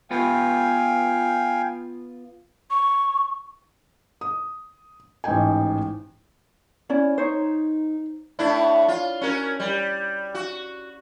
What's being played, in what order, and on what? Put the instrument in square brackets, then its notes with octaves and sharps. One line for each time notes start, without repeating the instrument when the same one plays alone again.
[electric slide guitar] B3 F4 B4 [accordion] F5 G5 G#5
[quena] C#6
[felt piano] D#6
A1 G#2 D#5 G5 G#5
[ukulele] C#4 E4 D5
[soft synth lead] D#4 [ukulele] C5 C#5
[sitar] A2 D4 E4
F4
C#4 F#4 A#4
G3
F#4